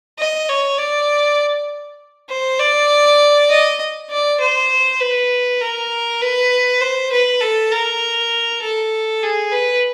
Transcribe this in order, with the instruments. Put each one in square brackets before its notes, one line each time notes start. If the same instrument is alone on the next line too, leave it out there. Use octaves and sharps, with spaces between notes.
[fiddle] D#5
C#5
D5
C5
D5
D#5
D5
C5
B4
A#4
B4
C5
B4
A4
A#4
A4
G#4
B4